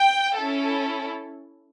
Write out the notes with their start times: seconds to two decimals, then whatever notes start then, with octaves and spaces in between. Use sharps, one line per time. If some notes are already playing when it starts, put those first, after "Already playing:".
Already playing: G5
0.37 C#4 E4 A4